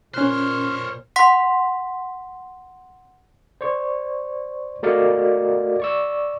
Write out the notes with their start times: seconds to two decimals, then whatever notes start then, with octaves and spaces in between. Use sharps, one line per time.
0.14 A#2 C#4 C5 C#5 F6 F#6
1.16 F#5 C6 B6
3.61 C5 D5 C#6
4.83 A3 F#4 A#4 D5 D#5 F5
5.80 D5 C#6 E6